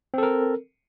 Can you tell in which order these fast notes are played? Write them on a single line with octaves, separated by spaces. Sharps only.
C4 A4 A#4